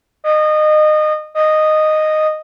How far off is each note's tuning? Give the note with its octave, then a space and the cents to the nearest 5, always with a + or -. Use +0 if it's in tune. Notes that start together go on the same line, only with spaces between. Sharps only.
D#5 -25
D#5 -10